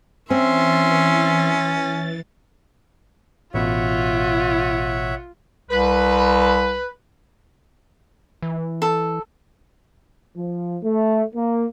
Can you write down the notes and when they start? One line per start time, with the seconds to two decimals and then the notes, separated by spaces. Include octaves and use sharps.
0.30 E3 C4 C#4 E5 C6 A6
3.54 A1 B2 F4 C#5 E5 F#5
5.71 C2 B4
8.42 E3
8.82 A4
10.37 F3
10.84 A3
11.35 A#3